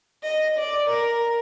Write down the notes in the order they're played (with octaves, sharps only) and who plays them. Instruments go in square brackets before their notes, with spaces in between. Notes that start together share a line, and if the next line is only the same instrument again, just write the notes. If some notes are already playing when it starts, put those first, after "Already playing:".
[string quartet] D#5
D5
A#4